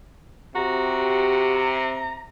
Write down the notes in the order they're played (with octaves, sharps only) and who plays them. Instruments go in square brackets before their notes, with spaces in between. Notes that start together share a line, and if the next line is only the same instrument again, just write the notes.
[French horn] C3 [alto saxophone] F#4 [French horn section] G4 [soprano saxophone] A#5